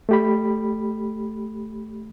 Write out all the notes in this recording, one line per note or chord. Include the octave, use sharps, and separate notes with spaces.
A3 G4 B5